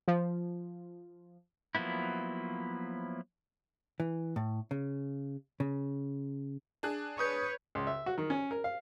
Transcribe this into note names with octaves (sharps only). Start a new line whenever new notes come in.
F3
F3 F#3 A#3 B3 E4
E3
A2
C#3
C#3
D4 G#4 F#6
B4 C#5 C#6 D#6 G6
C#2
E5
F#4
D#3
C#4
A#4
F5